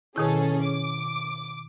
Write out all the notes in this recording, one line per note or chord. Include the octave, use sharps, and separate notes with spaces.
B2 D#3 C#4 E4 G#4 A4
D6